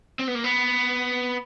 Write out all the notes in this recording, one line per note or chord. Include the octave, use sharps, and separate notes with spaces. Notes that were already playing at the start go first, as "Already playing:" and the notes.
C4
B3
A#3
B3